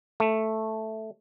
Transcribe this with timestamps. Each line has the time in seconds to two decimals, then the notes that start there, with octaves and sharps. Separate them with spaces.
0.20 A3